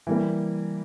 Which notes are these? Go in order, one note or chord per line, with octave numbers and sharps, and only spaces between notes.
E3 G3 A#3